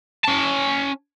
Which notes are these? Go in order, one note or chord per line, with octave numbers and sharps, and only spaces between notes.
C#4 A5